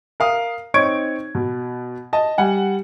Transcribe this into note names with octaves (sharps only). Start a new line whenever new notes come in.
A#4 F5 D#6
C4 D#4 C#5 C#6 G#6 D7
B2
D#5 A5
G3 F#5 G#5